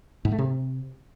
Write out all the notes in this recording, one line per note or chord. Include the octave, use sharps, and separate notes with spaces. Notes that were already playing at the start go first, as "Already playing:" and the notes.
G#2
A3
C3